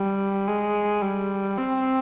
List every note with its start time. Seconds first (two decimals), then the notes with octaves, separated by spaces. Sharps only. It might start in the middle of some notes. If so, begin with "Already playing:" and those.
Already playing: G3
0.48 G#3
1.02 G3
1.57 C4